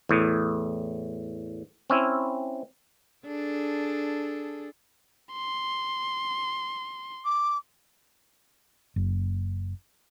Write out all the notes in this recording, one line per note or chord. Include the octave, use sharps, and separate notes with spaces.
E2 A2
C4 C#4 E4
D4 G#4 A4
C6
D6
F#1